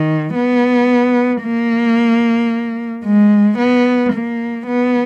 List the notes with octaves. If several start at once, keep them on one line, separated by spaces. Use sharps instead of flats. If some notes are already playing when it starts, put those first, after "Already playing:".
Already playing: D#3
B3
A#3
G#3
B3
A#3
B3